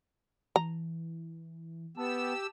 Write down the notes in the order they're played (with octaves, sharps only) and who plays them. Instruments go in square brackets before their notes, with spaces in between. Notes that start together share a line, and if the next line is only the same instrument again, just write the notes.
[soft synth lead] E3 [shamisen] A#5
[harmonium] B3 [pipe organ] G4 E6 [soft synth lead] A5